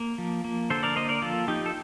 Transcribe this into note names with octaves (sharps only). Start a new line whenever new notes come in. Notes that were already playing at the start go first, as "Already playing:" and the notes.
Already playing: A#3
F3
A#3
D3 A4 C5
A#4 D5
A#3 C5 D#5
A#4 D5
F3 F4 A4
F3 D#4 G4
A4